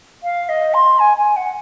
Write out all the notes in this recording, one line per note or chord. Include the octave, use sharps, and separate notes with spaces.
F5
D#5
C6
G#5
G#5
F#5